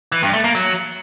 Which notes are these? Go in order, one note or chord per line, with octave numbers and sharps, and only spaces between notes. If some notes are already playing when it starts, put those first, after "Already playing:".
E3
G2
A3
A#3
F#3